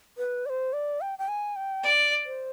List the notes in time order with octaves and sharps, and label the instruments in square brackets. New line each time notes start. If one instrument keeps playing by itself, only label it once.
[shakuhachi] B4
D5
C5
D5
G5
G5
G#5
G5
[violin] D5
[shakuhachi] C5